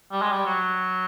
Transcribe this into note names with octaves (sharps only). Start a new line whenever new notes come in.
G3
G#3
G3
F#3